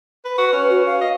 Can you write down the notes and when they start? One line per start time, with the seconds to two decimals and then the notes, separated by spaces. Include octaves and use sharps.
0.25 B4
0.38 F#4 B4
0.52 C#4
0.70 F#4
0.86 F5
1.01 D#5